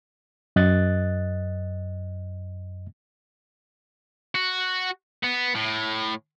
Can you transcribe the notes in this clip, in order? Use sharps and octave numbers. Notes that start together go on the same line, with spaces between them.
F#2 D#5 F#6 A6
F#4
B3
A2